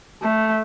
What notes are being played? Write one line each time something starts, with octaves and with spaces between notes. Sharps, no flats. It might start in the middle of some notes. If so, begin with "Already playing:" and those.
A3